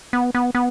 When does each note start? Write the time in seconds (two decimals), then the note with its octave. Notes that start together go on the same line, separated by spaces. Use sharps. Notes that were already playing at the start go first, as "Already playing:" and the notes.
0.13 B3
0.35 B3
0.55 B3